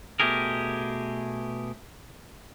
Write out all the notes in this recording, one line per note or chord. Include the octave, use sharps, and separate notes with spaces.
B2 A3 G4 G#4 A#4